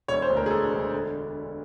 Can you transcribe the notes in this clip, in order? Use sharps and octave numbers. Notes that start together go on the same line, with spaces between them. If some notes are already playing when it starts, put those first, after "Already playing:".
E1 C#5
C5
D2
A#4
G#4
D3 A4
E1
D3